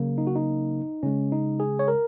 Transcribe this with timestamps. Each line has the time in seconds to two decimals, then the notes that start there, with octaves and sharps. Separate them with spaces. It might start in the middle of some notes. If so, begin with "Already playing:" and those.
Already playing: C#3 F#3 A#3
0.18 D#4
0.27 F#4
0.36 D#4
1.03 C#3 G#3 C#4
1.32 D#4
1.60 G#4
1.79 C#5
1.88 A#4